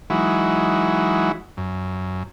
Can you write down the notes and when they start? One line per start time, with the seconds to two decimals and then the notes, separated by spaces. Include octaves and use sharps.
0.10 E3 F#3 G#3 D#4 E4 F#4
1.57 F#2